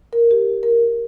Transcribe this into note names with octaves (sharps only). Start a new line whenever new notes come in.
A#4
G4
A#4